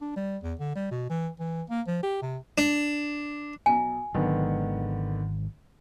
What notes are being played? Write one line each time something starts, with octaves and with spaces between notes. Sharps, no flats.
D4
G3
E2
D3
G3
B2
E3
E3
A#3
F3
G4
C3
D4
B1 G#5 A#5
G#1 D3 D#3 F#3 G#3 B3